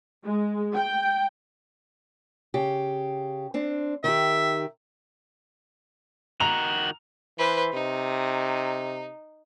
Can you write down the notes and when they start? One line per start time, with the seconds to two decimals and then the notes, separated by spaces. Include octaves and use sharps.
0.25 G#3
0.75 G5
2.54 C#3 G4
3.54 C4 D4
4.04 D#3 G4 E5
6.40 D#3 F#4 A#5 F7
7.38 E3 B4 C5
7.73 C3 D#4